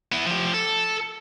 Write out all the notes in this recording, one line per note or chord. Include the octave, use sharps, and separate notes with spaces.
B3 E4
F3 G4
A4